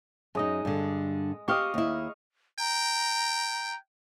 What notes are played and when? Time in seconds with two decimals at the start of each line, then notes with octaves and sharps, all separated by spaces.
0.35 F#2 G#3 D#4 D#5
0.65 G2 D3
1.48 C4 G4 D#5 F5 C#6
1.74 D#2 E4
2.59 G5 A#5